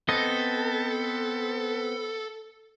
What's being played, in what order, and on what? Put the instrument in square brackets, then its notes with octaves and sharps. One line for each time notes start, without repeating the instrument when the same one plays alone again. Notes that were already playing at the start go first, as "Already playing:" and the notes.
[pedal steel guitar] B3 C4 D#5 [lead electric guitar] A4